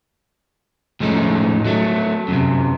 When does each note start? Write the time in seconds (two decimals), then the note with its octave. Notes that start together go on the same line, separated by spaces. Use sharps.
1.00 A2 F3 G#3 A3 C#4 D#4
1.65 F#3 A3
2.28 F#2 A2 C3